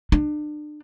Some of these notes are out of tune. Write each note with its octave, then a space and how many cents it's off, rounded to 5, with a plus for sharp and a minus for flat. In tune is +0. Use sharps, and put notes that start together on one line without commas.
D4 +35